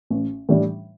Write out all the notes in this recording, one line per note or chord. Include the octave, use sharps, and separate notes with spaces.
A1
A2 E3 G3 D4